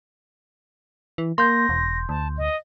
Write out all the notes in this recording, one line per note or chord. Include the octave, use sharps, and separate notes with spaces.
E3
A#3 C6 G6 A#6
E1
D2 A5
D#5